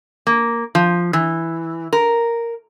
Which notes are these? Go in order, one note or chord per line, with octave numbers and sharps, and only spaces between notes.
A#3
F3
E3
A#4